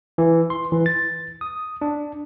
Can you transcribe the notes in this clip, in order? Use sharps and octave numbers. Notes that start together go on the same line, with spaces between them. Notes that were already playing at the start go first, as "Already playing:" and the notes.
E3
C6
E3
A6
D#6
D4